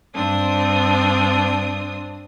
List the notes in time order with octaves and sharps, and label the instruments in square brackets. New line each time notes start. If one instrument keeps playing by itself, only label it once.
[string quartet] G2 C4 D4 D#6